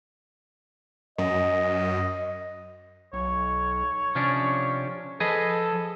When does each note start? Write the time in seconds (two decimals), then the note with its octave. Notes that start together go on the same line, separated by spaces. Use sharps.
1.18 F#2 D#5
3.13 B1 C#5
4.15 C3 F3 C#4 D4
5.20 F3 G#4 A4 B4 D#5